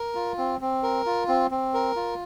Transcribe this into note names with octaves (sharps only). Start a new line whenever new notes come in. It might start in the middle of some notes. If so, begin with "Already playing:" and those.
Already playing: A#4
F4
C4
C4
A#4
F4
C4
C4
A#4
F4